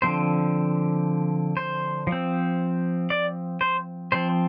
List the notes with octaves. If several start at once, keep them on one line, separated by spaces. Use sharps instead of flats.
D3 F3 C4 C5
C5
F3
C4
D5
C5
F3 C4 C5